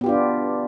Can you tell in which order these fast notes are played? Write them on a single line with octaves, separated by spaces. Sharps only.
B3 G4 F4 D4